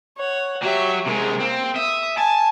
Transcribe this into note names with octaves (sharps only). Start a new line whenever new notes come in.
C#5 F#5
F#3 F#4 G4 E5
C3 G#3 G#4 A#4
A#3 C4
E5 D#6
G#5 A5